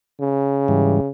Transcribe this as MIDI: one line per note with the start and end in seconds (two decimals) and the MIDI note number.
0.20 1.09 49
0.68 1.00 44
0.68 1.00 52
0.68 1.00 55